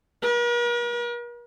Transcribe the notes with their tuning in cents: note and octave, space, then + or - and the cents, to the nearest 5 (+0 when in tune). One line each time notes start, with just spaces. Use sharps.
A#4 +45